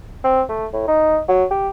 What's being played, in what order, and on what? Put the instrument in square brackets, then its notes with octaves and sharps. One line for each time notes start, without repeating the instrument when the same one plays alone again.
[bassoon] C4
A3
A2
D#4
F#3
G4